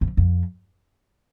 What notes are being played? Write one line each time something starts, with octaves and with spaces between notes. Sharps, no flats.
F2
F2